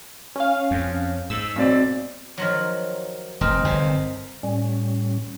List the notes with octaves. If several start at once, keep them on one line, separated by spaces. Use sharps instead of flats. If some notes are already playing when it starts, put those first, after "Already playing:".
C#4 F5
F2
G#2 E6 A6 B6
B1 C4 D5
D#3 F3 F#3
F1 C4 D#4 A#4
G1 C3
A2 G3 C#4